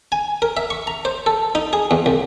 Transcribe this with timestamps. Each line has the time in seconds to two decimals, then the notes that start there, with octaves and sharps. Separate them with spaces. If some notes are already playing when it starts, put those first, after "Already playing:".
0.12 G#5
0.42 A#4
0.57 E5
0.70 C#6
0.87 A#5
1.05 C5
1.26 A4
1.55 D#4
1.73 G#4
1.91 E2
2.06 C2